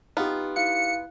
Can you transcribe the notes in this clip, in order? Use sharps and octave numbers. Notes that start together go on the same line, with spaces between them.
B3 D#4 F4 G4
E4 F5 F#6 C#7